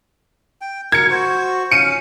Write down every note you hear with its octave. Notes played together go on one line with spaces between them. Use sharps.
G5
A#4 G#6 C#7
F#4 C5 C#6
C#4 F5 C#7 D#7